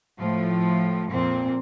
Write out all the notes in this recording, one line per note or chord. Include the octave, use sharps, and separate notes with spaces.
A2 F3
F2 A#2 C4